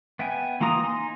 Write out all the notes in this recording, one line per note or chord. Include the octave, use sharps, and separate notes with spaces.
B3 E5 G5 G#5
E3 A#3 F4 A#5 D#6
D#4 G#5 C6